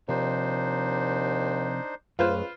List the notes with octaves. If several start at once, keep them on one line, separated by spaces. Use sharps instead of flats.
D#2 C3 F3 D4 D#4 C5
C#2 F#2 A3 F4 B4 C5